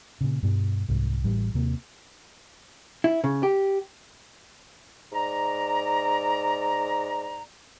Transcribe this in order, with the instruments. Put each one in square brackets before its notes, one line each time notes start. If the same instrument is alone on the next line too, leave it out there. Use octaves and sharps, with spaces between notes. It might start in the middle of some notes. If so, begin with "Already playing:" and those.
[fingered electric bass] A#2 C#3
G2 B2 G3
C2 G#2
A1 A2 G3
D#2 C3 A#3
[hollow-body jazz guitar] E4
C#3
G4
[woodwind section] G#2 D5 A#5